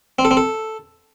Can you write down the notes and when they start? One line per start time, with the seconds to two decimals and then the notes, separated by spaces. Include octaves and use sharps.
0.19 C4
0.25 A4
0.31 C4
0.37 A4